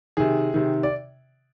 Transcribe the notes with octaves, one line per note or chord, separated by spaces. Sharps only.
C3 D#3 G#4
C3 D#3
D5